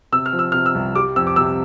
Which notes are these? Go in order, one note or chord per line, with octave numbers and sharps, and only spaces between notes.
C3 E6
F6
F3
E6
C3 F6
E6
C2
G3 D6
F2 E6
D6
C3 E6